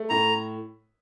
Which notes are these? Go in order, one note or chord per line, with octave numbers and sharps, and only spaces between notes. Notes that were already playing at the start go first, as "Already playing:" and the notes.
Already playing: A3
A2 A#5